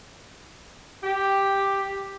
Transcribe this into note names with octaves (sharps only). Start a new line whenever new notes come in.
G4